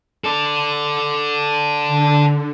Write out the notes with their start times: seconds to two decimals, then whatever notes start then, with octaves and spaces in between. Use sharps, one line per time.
0.24 A4 D5
1.88 D3